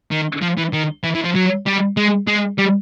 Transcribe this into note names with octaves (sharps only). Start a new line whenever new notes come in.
D#3
F3
E3
D#3
E3
E3
F3
F#3
G3
G#3
G#3
G3